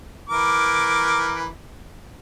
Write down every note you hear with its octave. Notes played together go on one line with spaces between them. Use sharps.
E3 A#4 D6